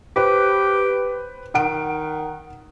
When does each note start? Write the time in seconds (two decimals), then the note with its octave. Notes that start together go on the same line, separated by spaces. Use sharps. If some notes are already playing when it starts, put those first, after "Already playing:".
0.16 G4 B4 C5
1.55 D#3 F#5 D7